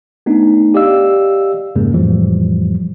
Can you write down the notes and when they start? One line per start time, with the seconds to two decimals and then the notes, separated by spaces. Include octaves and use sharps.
0.26 A3 B3 D4 D#4
0.74 G4 D5 D#5 F5 E6
1.75 F2 G#2 C#3 G#3 A#3
1.94 F2 A2 E3 F3 G3